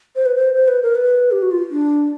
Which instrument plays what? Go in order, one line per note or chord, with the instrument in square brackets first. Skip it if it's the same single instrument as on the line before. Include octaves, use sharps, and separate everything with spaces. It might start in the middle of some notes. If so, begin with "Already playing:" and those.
[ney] C5
B4
C5
C5
B4
A#4
B4
G4
F#4
F4
D4